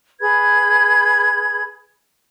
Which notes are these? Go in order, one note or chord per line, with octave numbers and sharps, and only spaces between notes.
G#4 B4 B5 G#6